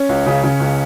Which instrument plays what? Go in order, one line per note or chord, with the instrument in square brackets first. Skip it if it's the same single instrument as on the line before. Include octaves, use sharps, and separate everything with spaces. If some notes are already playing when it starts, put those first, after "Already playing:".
Already playing: [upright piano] C#4
C#2
C#3
C#3
C#2